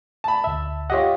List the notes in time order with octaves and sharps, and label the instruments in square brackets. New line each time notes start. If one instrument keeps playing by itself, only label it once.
[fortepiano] A5 B5
[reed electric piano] D2 E5
[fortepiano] F4 G4 D#5 [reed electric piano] C#5 F#5